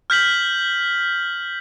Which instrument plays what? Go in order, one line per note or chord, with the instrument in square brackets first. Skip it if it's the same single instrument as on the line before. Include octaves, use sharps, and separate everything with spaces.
[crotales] F6 G6 B6 F#7